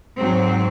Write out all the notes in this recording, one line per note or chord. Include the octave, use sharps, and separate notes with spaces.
G#2 F#3 C4